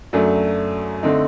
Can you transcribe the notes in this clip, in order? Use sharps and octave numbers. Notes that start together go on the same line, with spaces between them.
F#2 F#3 A3 D4
D3 A3 C4 D#4